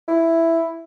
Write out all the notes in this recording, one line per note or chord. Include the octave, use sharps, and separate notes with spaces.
E4